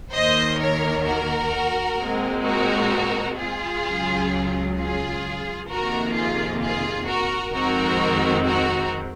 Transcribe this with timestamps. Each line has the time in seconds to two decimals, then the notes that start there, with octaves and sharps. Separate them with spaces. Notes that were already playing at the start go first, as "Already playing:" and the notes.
0.13 D#2 D#3 A#3 C5 D#5
0.59 A#4 C#5
1.06 F#4 A#4
1.98 A#2 G#3 C4
2.45 F#4 A#4
3.38 F4 G#4
3.84 C#2 C#3 F#3
4.76 F4 G#4
5.68 F2 C3 D#3 A#3 F#4 A#4
6.14 F4 G#4
6.61 F4 G#4
7.07 F#4 A#4
7.53 F2 D#3 G#3 C4 F#4 A#4
8.46 F#4 A#4